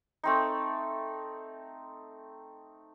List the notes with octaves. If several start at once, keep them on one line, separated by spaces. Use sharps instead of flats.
A3 C4 D#4